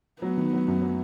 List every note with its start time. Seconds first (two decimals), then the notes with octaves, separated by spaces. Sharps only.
0.22 F#3 B3
0.37 D#3
0.53 F#3
0.68 F#2
0.82 F#3